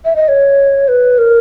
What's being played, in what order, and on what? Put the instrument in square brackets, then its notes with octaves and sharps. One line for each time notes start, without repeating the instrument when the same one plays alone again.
[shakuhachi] E5
D#5
C#5
B4
A#4